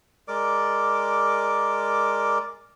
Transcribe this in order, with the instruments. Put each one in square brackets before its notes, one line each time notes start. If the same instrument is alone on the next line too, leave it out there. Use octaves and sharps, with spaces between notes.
[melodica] G#3 A#4 D5 D6